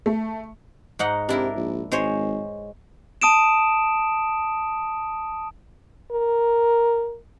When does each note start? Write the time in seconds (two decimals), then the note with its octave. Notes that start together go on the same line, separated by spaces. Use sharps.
0.06 A3
0.99 G#2 D#4 F#5
1.29 C3 D4 E4 A#4
1.56 A#1
1.92 G#1 G#3 C5 C#5
3.22 A5 D#6 D7 E7
6.12 A#4